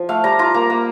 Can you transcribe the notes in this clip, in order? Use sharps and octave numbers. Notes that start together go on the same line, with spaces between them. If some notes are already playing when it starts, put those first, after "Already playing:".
Already playing: F3
A3 F5
G3 A#5
F4 A#5
A#3 A#5
A#3